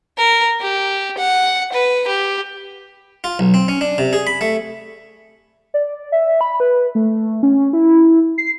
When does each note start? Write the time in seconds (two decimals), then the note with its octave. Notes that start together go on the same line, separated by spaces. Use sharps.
0.18 A#4
0.61 G4
1.18 F#5
1.73 B4
2.07 G4
3.24 F4
3.39 B1
3.54 C4
3.68 C#4
3.81 D4
3.98 C3
4.13 G#4
4.27 B5
4.41 A3
5.74 D5
6.12 E5
6.41 B5
6.60 B4
6.95 A3
7.43 C#4
7.73 E4
8.38 C7